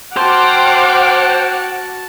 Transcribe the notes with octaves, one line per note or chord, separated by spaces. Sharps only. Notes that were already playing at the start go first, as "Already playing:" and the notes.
F#4 C5 F#5 G5 A5 D6 F6